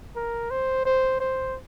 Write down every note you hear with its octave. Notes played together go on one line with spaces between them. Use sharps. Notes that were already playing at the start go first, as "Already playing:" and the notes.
A#4
C5
C5
C5